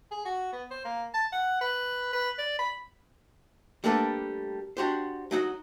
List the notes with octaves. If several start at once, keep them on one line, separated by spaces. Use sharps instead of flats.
G#4
F#4
B3
C5
A#3
A5
F#5
B4
B4
D5
B5
G3 A3 A#3 D4 A4 B4
D4 F#4 G4 C5
F#3 D#4 F#4